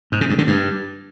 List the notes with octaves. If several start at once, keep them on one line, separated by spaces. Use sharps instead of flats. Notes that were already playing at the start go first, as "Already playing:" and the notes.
G#2
C#3
G2
D3
G2